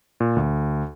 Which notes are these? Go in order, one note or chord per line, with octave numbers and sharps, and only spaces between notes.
A#2
D2